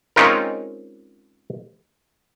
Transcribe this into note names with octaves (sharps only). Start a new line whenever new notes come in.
G#3 C4 C#4 D#4 F4 A#4